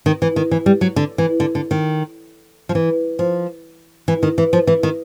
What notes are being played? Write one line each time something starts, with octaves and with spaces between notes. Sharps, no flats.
D#3
E3
D#3
E3
G3
F#3
D3
E3
D3
D3
D#3
F3
E3
F3
E3
D#3
E3
F3
E3
D#3